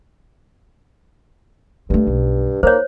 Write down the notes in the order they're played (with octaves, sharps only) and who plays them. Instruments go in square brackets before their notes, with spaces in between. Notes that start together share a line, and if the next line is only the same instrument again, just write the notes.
[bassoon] G2 [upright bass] A3 C4
[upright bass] B1
[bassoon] A#3 [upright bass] D#4 [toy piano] C5 C#5